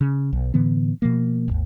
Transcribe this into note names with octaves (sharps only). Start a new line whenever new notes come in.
C#3
B1
A2 D3 E3 B3
B2 F3 A#3
D#1 G#1 D#2